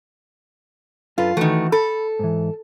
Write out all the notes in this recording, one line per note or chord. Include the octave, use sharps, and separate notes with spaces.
F#2 F4 A4 B4
D#3 E3 A3 F#4 B4
A4 B5
G#2 E3